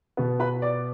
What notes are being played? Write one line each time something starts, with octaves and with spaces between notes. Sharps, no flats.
B2 B3
B4 B5
D5 D6